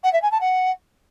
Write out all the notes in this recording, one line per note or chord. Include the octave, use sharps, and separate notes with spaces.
F#5
E5
G#5
A5
F#5